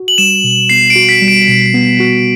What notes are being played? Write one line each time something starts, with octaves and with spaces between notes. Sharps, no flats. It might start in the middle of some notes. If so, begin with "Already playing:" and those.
Already playing: F#4
F#7
G3 E7
B2
B3 C7
D7
F#4
B6
G3
D7
B2
B3
F#4